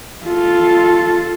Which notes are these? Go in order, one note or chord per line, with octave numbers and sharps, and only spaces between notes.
F4 A4